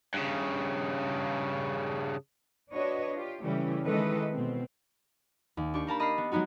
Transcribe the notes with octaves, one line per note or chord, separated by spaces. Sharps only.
G2 C#3
D4 F#4 B4 C#5 D#5
F4 G4
C#3 E3 G3 A3 C#4 G4
D#3 E3 G#3 A4 B4 D#5
B2 C4
D#2
D4 G4 C#6
A#3 A#4 A5 B5
D#5 B5 F6 C7
B3
F#3 G#3 B3 D#4 F#4